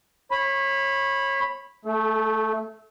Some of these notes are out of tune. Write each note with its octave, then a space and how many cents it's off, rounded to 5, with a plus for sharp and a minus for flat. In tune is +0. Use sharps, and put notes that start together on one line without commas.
C#5 -25 B5 +0
A3 +0 A4 -40